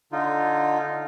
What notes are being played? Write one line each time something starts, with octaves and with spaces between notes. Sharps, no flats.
D3 D#4 F4